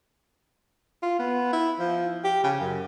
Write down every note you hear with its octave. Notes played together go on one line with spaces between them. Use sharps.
F4
B3
E4
F3
G4
C#3
F#2